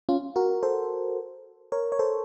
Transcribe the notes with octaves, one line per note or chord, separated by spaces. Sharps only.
C#4 F4
F#4 A#4
A4 C5
A#4 C#5
C#5
A4 C5